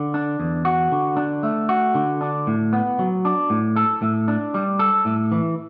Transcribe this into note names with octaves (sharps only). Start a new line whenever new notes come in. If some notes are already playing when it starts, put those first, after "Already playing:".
Already playing: D3
D4
E2
F#4
D3
D4
A3
F#4
D3
D4
A2
B3
F#3
D4
A2
A4
A2
D4
G3
A4
A2
E3